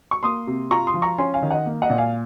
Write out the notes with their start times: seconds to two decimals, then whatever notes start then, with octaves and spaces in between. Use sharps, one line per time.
0.11 C#6
0.23 A#3 C6 D#6
0.47 C3
0.71 F4 A#5 C#6
0.87 C6 D#6
0.94 F3
1.02 A#5 C#6
1.18 C#4 G#5 C6
1.34 F5 G#5
1.42 D#3
1.51 D#5 F#5
1.66 A#3
1.82 D#5 F#5
1.90 A#2
1.98 F5 G#5